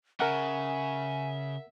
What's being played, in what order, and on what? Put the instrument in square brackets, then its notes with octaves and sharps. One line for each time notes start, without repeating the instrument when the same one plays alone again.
[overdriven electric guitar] C#3 [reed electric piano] A#4 F#5 [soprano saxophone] E5 [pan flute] G#5